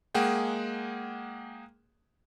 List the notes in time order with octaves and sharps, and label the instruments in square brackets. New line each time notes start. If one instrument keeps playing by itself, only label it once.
[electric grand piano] G#3 A#3 G#4 F#5 G5